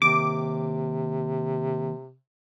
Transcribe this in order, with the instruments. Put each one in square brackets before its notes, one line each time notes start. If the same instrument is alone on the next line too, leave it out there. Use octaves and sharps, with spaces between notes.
[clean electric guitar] D#2 [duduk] C3 [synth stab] D6